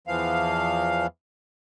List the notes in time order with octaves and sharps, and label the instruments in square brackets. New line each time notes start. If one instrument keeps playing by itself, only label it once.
[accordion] E2 E3 F3 F5